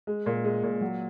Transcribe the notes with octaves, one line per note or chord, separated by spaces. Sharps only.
G#3
A#2
G#3
A#2
F#3